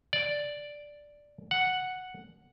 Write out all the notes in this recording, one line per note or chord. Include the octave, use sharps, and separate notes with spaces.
D5
F#5